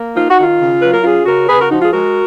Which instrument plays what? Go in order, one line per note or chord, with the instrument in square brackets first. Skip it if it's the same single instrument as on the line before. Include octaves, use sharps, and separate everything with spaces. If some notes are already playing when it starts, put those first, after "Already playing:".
Already playing: [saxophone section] A#3
D#4 F4
F#4
D#3 F4
C#3
F#3 B4
A#4
C#4 F4 G#4
C#3 F#4 A#4
C#3 G#4 B4
F#4 A#4
F3 D#4 F#4
F4 G#4
G#3 F#4 A#4